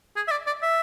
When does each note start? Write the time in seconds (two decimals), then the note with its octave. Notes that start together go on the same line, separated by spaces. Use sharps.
0.16 G#4
0.28 E5
0.31 D5
0.47 D5
0.62 E5